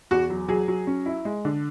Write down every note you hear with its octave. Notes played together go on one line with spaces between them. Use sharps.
E2 F#4
F#3
F#3 G#4
F#3
C#4
E4
G#3
D3